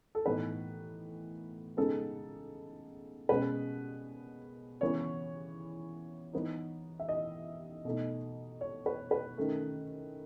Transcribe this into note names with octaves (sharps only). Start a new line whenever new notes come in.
A4
A2 E3 B3 D#4 B4
C#3 G#3 B3 D#4 A4
B2 G#3 C#4 B4
C#3 E3 B3 C#5
E3 B3 D#4
E5
D#5
B2 A3 D#4
C#5
B4
B4
D#3 A3 C#4